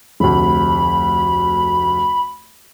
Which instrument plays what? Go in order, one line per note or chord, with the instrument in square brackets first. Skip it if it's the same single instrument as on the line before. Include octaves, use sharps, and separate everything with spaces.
[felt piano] F1 D2 [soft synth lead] B5